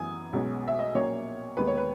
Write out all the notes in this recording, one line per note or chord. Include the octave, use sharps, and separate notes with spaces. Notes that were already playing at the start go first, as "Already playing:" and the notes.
Already playing: F#2 E3 B3 G#5 D#6
B1 B2 G#3 C#4
E5
D#5
A#1 A#2 F#3 A#3 C#4 C#5
D#2 D#3 G#3 B3 B4
C#5
B4